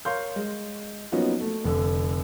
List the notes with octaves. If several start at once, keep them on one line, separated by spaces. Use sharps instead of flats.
A#4 C#5 F5 C6 C#6 G6
G#3
F3 F#3 A#3 B3 C#4 D#4
A3
F1 D3